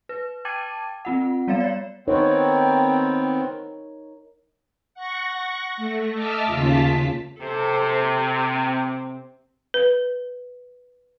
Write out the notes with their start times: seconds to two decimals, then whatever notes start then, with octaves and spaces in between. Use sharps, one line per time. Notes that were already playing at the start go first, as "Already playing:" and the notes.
0.09 B4
0.45 G5 A5 D6 G#6 A6 D#7
1.05 C4 F4 F#5
1.48 G3 B3 D5 F5 A6 E7
1.60 C#5 D5
2.08 D#3 B3 C4 D#4 A#4 C#5
4.94 F#5 C#6 A#6
5.77 A3
6.14 D#5 E5 A5 D6 E6 F6
6.46 D#2 C#3 F4 A5 B6
7.41 C3 A4 C5
8.49 C4
9.74 B4